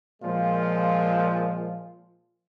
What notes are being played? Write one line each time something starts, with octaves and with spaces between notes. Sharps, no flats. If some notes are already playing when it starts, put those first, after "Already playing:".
A#2 F3 G#3 F4